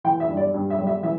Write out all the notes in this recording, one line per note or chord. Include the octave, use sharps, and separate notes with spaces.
E3 G5
E5
G2
D5
G2
E5
G3
E5
E3 E5